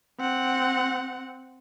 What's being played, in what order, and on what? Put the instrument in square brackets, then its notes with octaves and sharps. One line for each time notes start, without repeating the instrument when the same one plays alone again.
[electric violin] C4 F#5